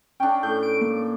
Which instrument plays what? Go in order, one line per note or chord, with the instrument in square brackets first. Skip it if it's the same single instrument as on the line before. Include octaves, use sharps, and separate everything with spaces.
[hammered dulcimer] C#4 D4 [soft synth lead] G5
[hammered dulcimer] A2 [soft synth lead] G6
[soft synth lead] D7
A#3